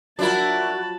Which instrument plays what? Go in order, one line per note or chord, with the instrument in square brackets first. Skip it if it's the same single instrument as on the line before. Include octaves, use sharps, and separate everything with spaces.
[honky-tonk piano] F3 F#3 [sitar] D4 E4 A#4 [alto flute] F#4 [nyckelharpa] A5 B5